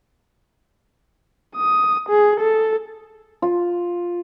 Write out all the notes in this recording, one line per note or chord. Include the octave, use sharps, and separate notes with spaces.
D#6
G#4
A4
F4